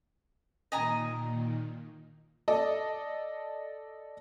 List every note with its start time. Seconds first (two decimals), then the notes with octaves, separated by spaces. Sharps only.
0.72 A#2 D#3 D#5 G#5 A#5
2.48 A4 D5 D#5